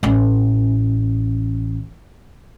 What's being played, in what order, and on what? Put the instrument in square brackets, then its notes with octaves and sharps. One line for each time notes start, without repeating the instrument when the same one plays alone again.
[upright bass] A1 C#4